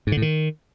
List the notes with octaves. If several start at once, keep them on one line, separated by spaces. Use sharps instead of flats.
G#2
D3
A2
D#3